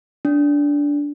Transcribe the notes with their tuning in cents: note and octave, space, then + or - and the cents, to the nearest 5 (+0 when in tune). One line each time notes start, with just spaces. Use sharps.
D4 -15